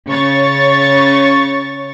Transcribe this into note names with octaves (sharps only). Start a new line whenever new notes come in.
C#3 C#5 C#6 A6